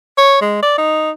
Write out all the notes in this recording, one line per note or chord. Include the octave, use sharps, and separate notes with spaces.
C#5
G#3
D5
D#4